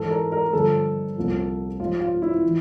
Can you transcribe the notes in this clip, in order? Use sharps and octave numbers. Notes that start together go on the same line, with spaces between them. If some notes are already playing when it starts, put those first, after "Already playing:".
Already playing: G#2 E3 A4
A#4
A#4
G2 D3 F3 A4
C2 A#2 F3
G#2 F3 F4
F4
E4
E3